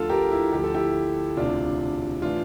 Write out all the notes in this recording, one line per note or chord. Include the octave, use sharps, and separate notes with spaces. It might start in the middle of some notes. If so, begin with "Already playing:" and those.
Already playing: D2 D3 F3 F4 A4
G4 A#4
E4
D2 D3 F3 G4
A4
E4 G4
E1 D2 C3 D4 F4
A2 E3 D4 F4